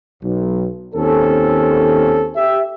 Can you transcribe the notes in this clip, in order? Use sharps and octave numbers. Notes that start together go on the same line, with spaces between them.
B1
D#2 C4 C#4 A4
G4 E5